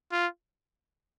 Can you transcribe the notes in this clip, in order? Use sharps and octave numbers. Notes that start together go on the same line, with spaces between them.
F4